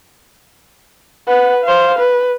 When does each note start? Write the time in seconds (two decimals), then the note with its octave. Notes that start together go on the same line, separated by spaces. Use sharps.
1.27 B4 F#5
1.64 C5 F5
1.98 B4